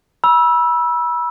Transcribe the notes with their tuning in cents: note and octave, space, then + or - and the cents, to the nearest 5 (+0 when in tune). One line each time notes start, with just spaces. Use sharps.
B5 -35 E6 +0